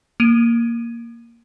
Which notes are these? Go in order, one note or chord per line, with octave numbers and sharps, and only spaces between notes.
A#3 D7 D#7